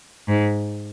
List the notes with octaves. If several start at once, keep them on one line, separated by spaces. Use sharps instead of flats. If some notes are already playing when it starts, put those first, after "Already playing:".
G#2